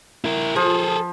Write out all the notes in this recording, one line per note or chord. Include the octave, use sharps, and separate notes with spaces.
E4 A#4
F3 G#4 A4